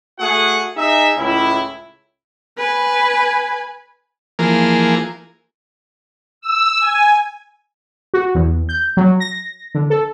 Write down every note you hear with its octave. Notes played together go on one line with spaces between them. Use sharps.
A3 F#4 G#4 F#5
D#4 G#4 E5
C#2 A2 E4
B4 G#5
E3 F3 A#3 G#4 A#4
E6
G#5
F#4
E2
G6
F#3
A#6
D3
A4